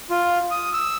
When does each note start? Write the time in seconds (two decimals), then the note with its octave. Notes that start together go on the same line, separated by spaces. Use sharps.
0.10 F4
0.51 D#6
0.73 E6